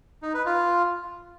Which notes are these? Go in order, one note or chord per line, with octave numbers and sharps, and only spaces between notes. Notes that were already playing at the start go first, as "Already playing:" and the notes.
D#4
B4
F4